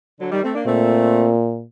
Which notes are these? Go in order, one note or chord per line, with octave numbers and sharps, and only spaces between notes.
D3 F#3
D#3 G3
A3 C4
A#3 D4
A#2 A3 C4